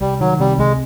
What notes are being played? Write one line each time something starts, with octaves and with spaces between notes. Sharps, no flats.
C2 G3
D#3 F#3
C3 G3
C2 G#3